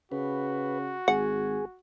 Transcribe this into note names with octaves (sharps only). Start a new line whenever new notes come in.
C#3 F#4 B4
G#1 G#4 F#5